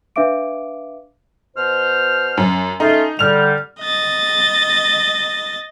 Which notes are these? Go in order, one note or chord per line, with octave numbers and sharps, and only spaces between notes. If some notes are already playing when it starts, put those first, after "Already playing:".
D4 B4 E5 F5 D6 D7
B2 C5 F6
F#2
A3 C#4 D#4 F4
D3 G3 F6 F7
D#5 A6